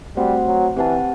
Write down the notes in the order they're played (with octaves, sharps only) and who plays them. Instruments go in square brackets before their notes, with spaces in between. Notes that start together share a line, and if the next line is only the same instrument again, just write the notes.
[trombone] G3 [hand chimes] A3 C4 F#4 C5 F#5
[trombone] F#3
[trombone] E3 [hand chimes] C4 G4 B4 F#5 A5